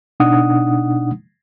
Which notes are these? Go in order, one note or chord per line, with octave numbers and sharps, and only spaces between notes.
B2 D4 D#4 F#5 D#6